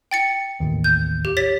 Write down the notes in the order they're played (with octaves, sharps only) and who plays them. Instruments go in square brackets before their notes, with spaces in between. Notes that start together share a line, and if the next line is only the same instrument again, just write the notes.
[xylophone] G5 A6 C#7
[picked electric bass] A1 D#2
[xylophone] G6
G4
C#5 A6 B6